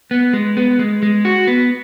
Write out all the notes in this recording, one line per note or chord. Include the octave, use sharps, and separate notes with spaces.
B3
G#3
B3
G#3
G#3
F#4
B3